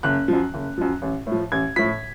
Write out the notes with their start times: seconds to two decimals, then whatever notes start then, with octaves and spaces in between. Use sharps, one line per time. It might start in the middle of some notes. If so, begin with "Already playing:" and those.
0.03 F#1 F#6
0.28 F#2 F3
0.54 F#1
0.78 F#2 F3
1.02 A1
1.27 A2
1.32 F3
1.52 A1 G#6
1.76 A2 F3 B6